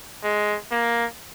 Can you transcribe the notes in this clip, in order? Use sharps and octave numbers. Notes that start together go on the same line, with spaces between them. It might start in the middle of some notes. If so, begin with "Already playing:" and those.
G#3
A#3